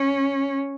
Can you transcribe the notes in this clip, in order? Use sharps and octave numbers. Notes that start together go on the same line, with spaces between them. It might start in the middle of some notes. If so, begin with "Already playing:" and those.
Already playing: C#4